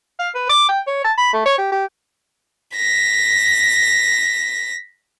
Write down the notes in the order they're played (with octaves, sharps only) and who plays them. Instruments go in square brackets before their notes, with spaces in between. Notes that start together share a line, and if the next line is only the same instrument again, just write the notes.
[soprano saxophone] F5
B4
D6
G5
C#5
A5
B5
A3
C#5
G4
G4
[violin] A#6 B6